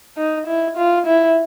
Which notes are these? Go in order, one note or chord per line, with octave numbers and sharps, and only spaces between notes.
D#4
E4
F4
E4